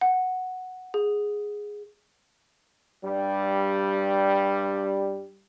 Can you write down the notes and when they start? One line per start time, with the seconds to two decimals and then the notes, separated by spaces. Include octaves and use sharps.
0.01 F#5
0.94 G#4
3.04 G2 G3